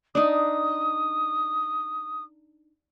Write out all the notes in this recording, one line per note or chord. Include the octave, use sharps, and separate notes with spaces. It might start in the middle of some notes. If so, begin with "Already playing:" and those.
D4 D#4 D#6